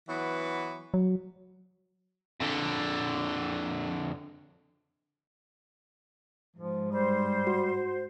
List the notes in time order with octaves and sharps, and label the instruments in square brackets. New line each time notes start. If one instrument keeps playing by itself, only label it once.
[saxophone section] E3 F#3 B3
[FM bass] F#3
[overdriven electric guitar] F2 D3
[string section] G#2 [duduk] F3
[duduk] G3 [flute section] C5
[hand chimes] F#4